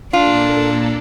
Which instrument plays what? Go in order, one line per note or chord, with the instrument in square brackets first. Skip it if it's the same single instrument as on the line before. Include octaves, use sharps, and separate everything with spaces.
[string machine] A#2 A#3 A4 [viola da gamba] D4 [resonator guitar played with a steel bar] F4